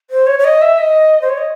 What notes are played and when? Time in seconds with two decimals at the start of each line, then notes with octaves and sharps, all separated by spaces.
0.10 C5
0.27 C#5
0.39 C#5
0.45 D#5
0.62 E5
0.78 D#5
1.22 C5
1.29 C#5
1.38 D#5